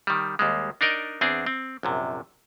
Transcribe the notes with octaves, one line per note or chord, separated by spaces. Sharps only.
D#3 G3
D#2 G3 G#3
D4 D#4 A#4 D5 D#5
E2 C4 D4 G#4
C4
A#1 F#2 C3